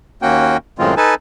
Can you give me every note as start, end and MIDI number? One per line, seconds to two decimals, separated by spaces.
0.22 0.57 39
0.22 0.57 58
0.22 0.57 61
0.22 0.57 66
0.22 0.57 79
0.79 0.95 42
0.79 0.95 45
0.79 0.95 51
0.79 0.95 56
0.79 0.95 60
0.79 0.95 65
0.97 1.15 63
0.97 1.15 69
0.97 1.15 71
0.97 1.15 80
0.97 1.15 81